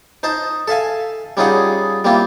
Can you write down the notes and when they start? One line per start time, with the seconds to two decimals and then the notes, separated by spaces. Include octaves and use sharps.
0.23 D#4 C5 A5
0.68 A4 E5 F5 G#5
1.37 G3 C#4 D#4 F4 G#4 F#5
2.04 G3 A#3 C4 E4 F4